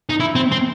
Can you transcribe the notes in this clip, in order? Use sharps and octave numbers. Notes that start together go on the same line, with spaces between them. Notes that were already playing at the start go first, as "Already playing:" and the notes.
D#4
E4
C4
C4